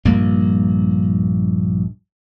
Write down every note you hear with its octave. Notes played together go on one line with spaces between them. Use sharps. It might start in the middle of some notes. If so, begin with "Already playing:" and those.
A#1 G2 A#3